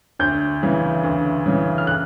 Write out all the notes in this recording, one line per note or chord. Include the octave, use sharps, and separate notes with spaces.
D2 G6
C#3 E3
D2
C#3 E3
F6
F#6